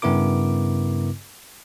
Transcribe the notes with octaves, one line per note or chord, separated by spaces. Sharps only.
G2 C#3 B3 E4 A#4 D6